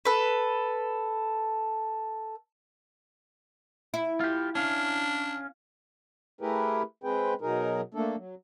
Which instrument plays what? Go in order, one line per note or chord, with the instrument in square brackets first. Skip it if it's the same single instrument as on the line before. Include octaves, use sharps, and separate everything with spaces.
[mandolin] A4 B4
[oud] E4
[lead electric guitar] F4 G4
[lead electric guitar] C#4 F5 [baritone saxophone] D4
[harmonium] A3 E4 G4 G#4 A#4 B4
G#3 C4 G#4 B4 G5
B2 F#3 D#4 G#4 A#4
A3 A#3 D4 A4
F#3